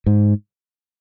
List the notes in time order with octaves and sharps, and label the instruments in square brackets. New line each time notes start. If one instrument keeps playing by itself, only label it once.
[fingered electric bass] G#2